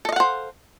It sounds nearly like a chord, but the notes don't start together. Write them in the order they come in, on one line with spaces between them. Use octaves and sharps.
A4 D#5 F5 F#5 C5